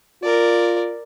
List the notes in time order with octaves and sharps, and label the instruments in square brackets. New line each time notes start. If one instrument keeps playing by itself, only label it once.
[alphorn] F4 [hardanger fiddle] A#4 D5